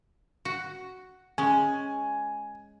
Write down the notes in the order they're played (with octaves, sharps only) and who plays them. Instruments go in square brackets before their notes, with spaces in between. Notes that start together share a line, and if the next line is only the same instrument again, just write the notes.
[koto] F#4
[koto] G#3 C#4 [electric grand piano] G#5